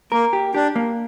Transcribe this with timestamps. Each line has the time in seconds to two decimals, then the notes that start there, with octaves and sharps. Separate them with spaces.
0.12 A#3 A#4
0.33 G4
0.54 D4 G4
0.76 A#3